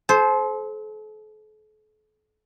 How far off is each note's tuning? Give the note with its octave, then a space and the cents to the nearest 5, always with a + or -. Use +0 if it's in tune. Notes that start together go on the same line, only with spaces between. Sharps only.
A4 -40 C5 +0